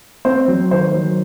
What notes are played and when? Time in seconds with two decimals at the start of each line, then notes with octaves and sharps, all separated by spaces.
0.25 C4 C5
0.48 F#3
0.71 D#3 C5
0.94 F#3